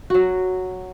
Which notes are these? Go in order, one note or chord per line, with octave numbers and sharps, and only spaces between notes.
F#3 F#4